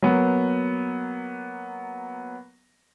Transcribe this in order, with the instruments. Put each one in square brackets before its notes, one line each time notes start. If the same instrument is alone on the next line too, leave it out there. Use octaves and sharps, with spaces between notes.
[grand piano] F#3 A#3 B3